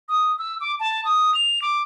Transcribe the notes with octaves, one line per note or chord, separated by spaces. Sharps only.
D#6
E6
D6
A5
D#6
F7
D6